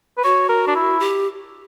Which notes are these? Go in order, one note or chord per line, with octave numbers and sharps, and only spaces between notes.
B4
F#4 C#5
A#4
D4
E4
G4